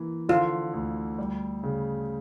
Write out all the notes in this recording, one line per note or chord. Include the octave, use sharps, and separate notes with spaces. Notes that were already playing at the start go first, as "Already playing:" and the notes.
Already playing: E3 A#3
D3 F4
D2
G3
C#3